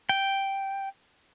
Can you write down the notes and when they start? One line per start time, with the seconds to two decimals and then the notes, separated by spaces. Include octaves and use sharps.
0.09 G5